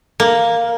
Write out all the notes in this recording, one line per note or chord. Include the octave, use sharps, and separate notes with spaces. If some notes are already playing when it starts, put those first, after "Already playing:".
A#3